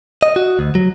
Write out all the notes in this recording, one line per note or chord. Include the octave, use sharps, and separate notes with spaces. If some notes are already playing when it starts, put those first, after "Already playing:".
D#5
F#4
D2
F#3